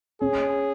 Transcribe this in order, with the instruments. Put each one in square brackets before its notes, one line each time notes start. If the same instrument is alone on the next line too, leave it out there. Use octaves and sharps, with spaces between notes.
[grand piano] C#4 [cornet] G#4